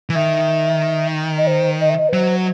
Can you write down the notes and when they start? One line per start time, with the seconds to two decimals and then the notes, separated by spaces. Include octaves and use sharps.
0.10 E3
0.15 D#3 E5
1.38 D#5
1.47 C5
1.81 D#5
1.90 E5
1.99 D#5
2.09 B4
2.12 F#3 C5